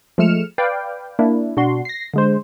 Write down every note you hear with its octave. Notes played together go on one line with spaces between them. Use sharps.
F3 G#3 A3 F6 C#7 E7
B4 D5 F5 G5
A#3 D4 E4
B2 D4 F#4 C6
A#6 C7
D3 G#3 C5